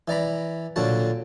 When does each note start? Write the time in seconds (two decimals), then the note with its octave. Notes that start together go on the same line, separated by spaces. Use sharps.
0.08 E3 D5 A#5 B5
0.76 A#2 D3 F#3 F#4 A5